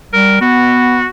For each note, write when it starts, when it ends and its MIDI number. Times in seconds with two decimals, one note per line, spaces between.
0.13 0.41 55
0.13 0.37 70
0.41 1.05 59
0.41 1.07 66